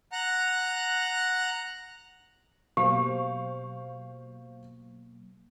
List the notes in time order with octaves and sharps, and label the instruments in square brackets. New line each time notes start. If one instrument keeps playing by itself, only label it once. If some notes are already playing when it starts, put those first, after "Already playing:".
[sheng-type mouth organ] F#5 A#5 F#6
[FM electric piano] B2 F#3 A#3 [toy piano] G4 [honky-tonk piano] C5 F5 C#6